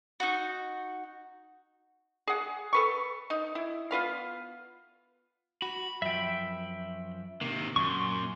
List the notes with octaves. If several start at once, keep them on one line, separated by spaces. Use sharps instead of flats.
D#4 F#4
G#4 F#5
A4 B4 C#6
D#4
E4
B3 F4 B4 F5
F#4 B5
F#2 F3 E5 G5
C3 D#3 A#3
F#2 A#2 C6 C#6